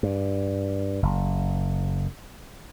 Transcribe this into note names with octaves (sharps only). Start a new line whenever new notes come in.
G2
F#1